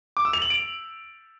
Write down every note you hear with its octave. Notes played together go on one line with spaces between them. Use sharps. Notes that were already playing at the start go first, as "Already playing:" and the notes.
D6
E6
F7
F#7
D7